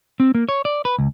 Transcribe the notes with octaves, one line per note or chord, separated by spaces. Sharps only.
C4
A#3
C#5
D5
B4
C#2